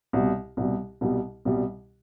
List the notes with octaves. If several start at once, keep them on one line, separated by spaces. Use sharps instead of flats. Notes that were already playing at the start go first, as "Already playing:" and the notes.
C2 B2 G3
C2 B2 G3
C2 B2 G3
C2 B2 G3